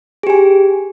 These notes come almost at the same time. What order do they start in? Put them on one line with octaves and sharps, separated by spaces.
G#4 G4 G#5